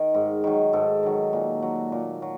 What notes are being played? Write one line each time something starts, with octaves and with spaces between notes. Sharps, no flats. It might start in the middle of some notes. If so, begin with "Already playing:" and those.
Already playing: D#3 A#4
G#2
D#3 F#3
G#2 A4
D#3 F#3
A#2
F#3
A#2
F#3